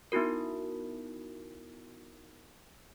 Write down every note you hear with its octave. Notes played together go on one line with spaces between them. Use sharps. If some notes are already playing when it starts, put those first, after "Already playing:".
B3 D#4 E4 F#4 A#4